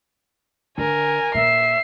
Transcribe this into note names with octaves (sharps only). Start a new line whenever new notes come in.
D3 A#4 G#5
A#2 E5 C7